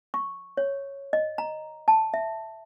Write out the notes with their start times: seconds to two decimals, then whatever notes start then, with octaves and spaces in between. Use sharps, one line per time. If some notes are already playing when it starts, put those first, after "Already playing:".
0.14 C#6
0.57 C#5
1.13 D#5
1.38 A#5
1.88 A5
2.14 E5